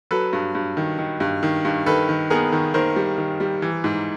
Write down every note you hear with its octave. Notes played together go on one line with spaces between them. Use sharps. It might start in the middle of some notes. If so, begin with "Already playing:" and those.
F#3 A4 B4
G2
G2
D#3
D#3
G2
D#3
G2
D#3 A4 B4
D#3
B3 G#4 A#4
D#3
D#3 A#4 C5
G3
D#3
G3
E3
G#2